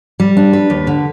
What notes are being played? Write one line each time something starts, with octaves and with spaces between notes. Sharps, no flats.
G3
D4
B4
D#2
D3